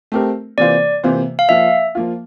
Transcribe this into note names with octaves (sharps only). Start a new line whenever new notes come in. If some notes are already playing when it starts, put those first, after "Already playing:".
A3 C4 G4 A#4
C3 E3 A#3 F4 C5 D5
C3 E3 A#3 F4 C5
F5
F3 A#3 F4 E5
F3 A#3 F4